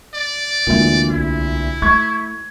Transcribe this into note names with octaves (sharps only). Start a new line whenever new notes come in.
D5
D2 A#2 E3 G#3
C2 E4
A3 C#6 G#6